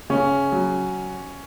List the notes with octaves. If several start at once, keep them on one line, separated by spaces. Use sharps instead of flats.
C#3 C#4
F#3